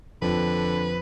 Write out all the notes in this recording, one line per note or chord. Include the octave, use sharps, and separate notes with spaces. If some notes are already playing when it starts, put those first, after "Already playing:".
F2 D3 B4